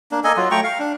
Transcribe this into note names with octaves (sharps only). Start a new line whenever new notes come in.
A#3 D4
A#3 A4 D#5 G#5
F#3 F4
A3 G5 A#5 C#6
F5
D4